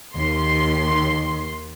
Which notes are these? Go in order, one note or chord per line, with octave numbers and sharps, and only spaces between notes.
D#2 C6